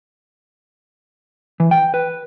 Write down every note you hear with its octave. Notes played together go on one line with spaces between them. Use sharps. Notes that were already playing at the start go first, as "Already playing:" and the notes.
E3
G5
B4